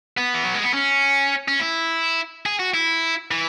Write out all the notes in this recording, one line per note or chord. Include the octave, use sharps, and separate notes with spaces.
B3
E3
F#3
G#3
B3
C#4
C#4
E4
G#4
F#4
E4
E3